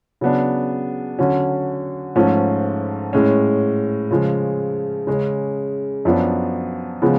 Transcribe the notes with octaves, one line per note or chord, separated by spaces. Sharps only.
C#3 F#3 B3 D4
D3 F#3 C#4
G#2 F3 A3 C#4
A2 G#3 C#4
C#3 F3 G#3
C#3 G#3 C#4
F#2 F3 B3 D4
C#3 F3 G#3 B3